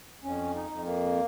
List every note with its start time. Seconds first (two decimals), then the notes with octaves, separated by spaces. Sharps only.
0.24 F2 C#4
0.55 D#4
0.70 F2
0.86 A#3